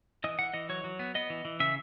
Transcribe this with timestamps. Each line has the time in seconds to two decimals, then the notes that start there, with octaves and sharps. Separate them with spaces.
0.24 E3 D#5
0.39 E3 F#5
0.54 E3 D#5
0.69 F#3 C#5
0.84 F#3
0.99 B3
1.15 B3 D#5
1.30 E3
1.45 E3
1.60 C#3 E5